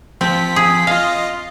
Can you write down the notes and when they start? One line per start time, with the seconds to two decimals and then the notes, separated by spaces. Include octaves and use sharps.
0.21 F3 C4 B6
0.56 G#4
0.87 F4 D#5 F5